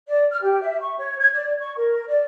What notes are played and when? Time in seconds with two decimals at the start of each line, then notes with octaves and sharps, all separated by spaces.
0.06 D5
0.31 F6
0.42 G4
0.61 E5
0.80 C#6
0.97 C#5
1.19 G#6
1.32 D5
1.60 C#6
1.76 A#4
2.07 D5